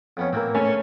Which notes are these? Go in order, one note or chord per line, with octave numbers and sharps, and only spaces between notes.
F2 B3 C#4
A2 E3 A#3 C4 A#4
A3 C#4 B4